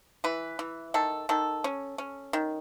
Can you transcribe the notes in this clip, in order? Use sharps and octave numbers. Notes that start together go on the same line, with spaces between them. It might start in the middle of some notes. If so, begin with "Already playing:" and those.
E3 B4
E3
D#3 A4
D#3 A4
C#4
C#4
D#3